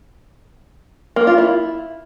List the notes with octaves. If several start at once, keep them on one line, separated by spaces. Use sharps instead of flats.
A#3
F4
E4